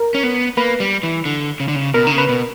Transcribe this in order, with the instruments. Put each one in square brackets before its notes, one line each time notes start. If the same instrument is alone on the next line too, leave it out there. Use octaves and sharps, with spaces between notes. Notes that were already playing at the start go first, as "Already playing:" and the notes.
Already playing: [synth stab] A#4
[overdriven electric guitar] C#4
B3
[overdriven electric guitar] A#3 [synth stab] B4
[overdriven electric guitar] G3
E3
D3
C#3
D3
C#3
[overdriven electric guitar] B2 [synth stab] A#4
[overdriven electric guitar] D3
C#3
[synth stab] B4
[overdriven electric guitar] B2